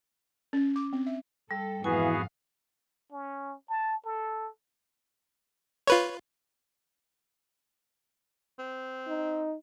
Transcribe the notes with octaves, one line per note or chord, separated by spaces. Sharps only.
C#4
D6
C4
E5
G3 A4
F2 G#2 E3 B3 F#4 G#4 F5 G#5
C#4
A5
A4
F4 B4 C#5
C4
D#4